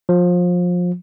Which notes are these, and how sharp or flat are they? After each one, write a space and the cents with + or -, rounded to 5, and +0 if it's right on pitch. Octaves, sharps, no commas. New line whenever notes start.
F3 +25